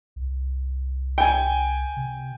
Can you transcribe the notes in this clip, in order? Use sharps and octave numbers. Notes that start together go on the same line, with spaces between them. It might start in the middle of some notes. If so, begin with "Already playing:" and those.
C2
G5 G#5
C3